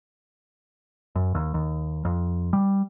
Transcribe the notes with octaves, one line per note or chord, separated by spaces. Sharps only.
F#2
D#2
D#2
F2
G3